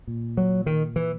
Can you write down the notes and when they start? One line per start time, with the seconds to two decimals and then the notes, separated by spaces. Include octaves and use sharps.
0.07 A#2
0.37 F#3
0.66 D#3
0.96 E3